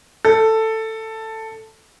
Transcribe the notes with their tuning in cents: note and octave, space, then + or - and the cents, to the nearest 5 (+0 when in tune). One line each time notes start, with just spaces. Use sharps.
A4 +10